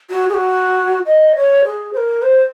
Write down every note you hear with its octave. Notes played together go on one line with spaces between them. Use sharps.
F#4
G#4
F#4
D#5
C#5
G#4
C5
A#4
C5